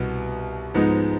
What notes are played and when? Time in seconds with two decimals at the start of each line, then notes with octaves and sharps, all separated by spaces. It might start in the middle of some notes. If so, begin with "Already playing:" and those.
Already playing: C2 B2 B3
0.74 G#2 F3 G#3 B3 D#4